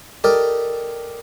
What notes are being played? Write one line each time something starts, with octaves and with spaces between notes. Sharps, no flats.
G4 A4 A#4 D5 D#5